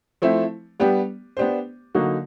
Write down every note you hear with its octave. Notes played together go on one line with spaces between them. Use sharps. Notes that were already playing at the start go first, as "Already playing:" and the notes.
F3 A3 C4 E4
G3 B3 D4 G4
B3 D4 G4 C5
D3 F#3 A#3 D#4 F#4